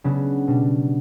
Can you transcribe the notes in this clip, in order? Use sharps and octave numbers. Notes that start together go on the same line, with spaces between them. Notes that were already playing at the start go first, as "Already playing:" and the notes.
C#3 F#3 B3 D4 F#4
B2 G3 D4